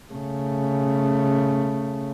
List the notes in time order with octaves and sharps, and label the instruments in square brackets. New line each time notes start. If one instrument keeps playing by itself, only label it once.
[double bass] C#3 A3